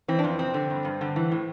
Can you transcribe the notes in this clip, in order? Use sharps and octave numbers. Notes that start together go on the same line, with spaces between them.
E3 C4
D4
F2 C4
C3 C4
D3
G2
G2
D3
E3
A2